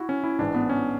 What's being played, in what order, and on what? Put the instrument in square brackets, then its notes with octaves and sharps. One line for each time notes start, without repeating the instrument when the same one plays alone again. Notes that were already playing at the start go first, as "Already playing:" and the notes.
Already playing: [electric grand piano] E4 F#4
C#4
E4
A1 G#2 E3 D4
B3
C#4